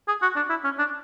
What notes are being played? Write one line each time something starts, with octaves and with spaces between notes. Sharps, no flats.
G#4
F#4
D4
E4
C#4
D4